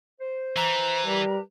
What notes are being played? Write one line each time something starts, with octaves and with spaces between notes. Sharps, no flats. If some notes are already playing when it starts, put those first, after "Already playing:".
C5
E3 A#5
G3 G4 A#4 B4